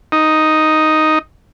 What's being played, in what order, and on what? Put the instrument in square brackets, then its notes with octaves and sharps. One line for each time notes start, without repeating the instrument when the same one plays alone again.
[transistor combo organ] D#4